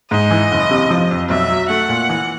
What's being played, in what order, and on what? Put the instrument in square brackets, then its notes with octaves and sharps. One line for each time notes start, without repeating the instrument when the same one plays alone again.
[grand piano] G#2 [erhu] D#5
[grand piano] E3
F#1
C3
F3
F2
[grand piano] B1 [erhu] E5
[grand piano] F#3
[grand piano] A3 [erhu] F#5
[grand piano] A#2
E3